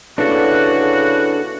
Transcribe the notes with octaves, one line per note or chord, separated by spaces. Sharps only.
C#3 A#3 B3 D4 E4 F#4 A4